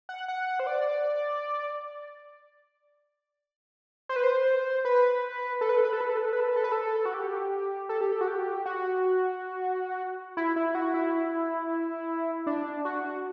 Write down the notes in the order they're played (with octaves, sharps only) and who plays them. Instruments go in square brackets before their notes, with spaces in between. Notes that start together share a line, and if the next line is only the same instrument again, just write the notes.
[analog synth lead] F#5
F#5
C5
D5
C5
B4
C5
B4
A4
B4
A4
B4
A4
B4
A4
B4
A4
B4
A4
B4
A4
B4
A4
F#4
G4
A4
G4
A4
F#4
G4
F#4
E4
E4
F#4
E4
D4
F#4